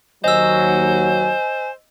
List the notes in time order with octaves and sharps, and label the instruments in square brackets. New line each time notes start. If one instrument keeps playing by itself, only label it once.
[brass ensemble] D#2 F#3 [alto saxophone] C5 [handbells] D#5 E6 [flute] G#5